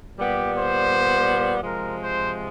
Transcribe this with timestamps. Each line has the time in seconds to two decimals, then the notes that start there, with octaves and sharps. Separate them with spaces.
0.17 A#2 G3 B3 G4
0.54 C5
1.62 C3 F3 G#3 A#4
1.99 C5